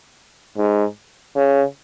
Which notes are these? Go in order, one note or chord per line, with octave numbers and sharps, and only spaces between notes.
G#2
C#3